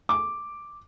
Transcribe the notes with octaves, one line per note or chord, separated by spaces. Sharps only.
D6